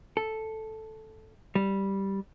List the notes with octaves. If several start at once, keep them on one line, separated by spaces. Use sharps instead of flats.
A4
G3